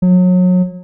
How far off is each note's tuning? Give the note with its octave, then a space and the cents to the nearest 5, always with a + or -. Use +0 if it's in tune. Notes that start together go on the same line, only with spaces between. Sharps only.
F#3 -30